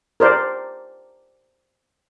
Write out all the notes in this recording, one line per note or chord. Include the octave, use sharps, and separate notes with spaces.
A#4 C5 D5